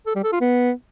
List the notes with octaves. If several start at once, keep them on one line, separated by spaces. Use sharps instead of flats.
A4
G3
A4
F4
B3